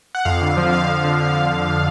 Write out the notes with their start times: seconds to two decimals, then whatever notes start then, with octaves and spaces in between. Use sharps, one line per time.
0.15 F#5
0.25 F2 F5
0.41 D3
0.57 F3
0.73 F2 F5
0.89 F2
1.05 D3
1.20 F3